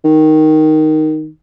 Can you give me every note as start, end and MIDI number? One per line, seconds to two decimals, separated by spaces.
0.04 1.28 51